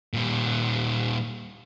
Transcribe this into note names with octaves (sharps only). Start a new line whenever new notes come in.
A#2 G3